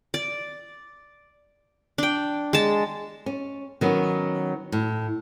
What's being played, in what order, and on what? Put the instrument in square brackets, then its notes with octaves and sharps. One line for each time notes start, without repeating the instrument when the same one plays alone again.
[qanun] D5
D4 G5
G#3 A5
[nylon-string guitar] C#4
D#3 F#3 B3 C#4
A2